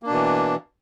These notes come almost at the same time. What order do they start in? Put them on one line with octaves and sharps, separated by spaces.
A#3 D4 B2 E3